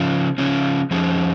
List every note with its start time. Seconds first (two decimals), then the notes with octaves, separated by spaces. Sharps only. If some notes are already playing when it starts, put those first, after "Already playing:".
Already playing: C#3 F3 C#4
0.38 C#3 F3 C#4
0.91 F2 F3 C#4 G#4